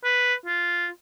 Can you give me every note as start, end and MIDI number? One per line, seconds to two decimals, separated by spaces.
0.04 0.34 71
0.46 0.88 65